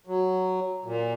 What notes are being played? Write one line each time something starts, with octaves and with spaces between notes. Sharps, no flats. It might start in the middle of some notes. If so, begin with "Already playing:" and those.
F#3
A#2